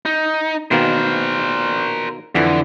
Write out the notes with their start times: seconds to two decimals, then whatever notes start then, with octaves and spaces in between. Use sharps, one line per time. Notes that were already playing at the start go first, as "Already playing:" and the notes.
0.05 D#4
0.71 B2 D#3 A#3 A#4 C5
2.35 F2 D3 E3